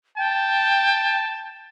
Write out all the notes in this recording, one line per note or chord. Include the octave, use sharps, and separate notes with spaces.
G5 A5